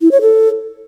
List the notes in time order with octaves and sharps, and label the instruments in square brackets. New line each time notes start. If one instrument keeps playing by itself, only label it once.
[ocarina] E4
C#5
A4